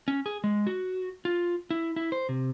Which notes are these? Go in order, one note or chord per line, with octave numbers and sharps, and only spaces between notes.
C#4
G#4
G#3
F#4
F4
E4
E4
C5
C3